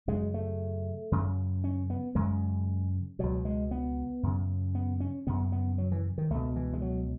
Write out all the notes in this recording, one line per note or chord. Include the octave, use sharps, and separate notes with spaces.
F#2 C#3 G#3
A3
F#2 C#3
C#4
B3
F#2 C#3 G#3
C#2 B2 F#3
G#3
B3
F#2 C#3
B3
C#4
F#2 C#3 B3
B3
F#3
E3
D#3
C#2 B2 A3
E3
G#3
F#3